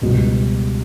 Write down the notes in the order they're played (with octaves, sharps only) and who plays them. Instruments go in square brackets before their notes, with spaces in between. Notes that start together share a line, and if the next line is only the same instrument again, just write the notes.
[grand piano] C#2 B2 G3